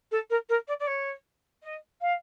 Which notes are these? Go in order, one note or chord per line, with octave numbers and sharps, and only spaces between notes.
A4
A#4
A#4
D5
D5
C#5
D#5
F5